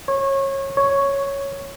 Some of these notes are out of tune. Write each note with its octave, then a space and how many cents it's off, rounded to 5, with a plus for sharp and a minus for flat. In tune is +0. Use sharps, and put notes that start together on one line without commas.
C#5 -25
C#5 +0